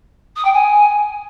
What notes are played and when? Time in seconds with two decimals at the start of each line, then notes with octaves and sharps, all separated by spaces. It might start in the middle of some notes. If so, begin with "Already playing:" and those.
0.36 D#6
0.44 G5
0.53 G#5